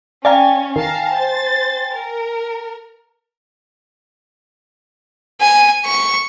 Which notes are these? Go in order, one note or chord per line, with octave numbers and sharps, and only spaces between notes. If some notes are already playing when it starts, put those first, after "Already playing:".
C#4 D5 F5 G5 G#5 A#5
D#3 F5 A5 A#5
C5 A6
A#4
G#5
C#6